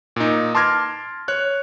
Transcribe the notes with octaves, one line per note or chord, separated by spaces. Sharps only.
A#2 D#4
A5 C6 D6 F6 G#6 A#6
C#5 F#6